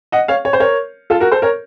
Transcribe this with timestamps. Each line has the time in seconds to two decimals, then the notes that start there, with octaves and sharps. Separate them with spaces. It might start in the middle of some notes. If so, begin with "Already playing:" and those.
0.12 D#5 F#5
0.28 C#5 F5
0.45 C#5
0.53 C5
0.60 A#4 C#5
1.10 F4 A4
1.20 F#4 A#4
1.32 A4 C5
1.42 A#4 C#5